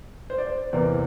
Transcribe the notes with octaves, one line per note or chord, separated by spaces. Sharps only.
C5
D5
C5
E2 C3 E3 A#3 D5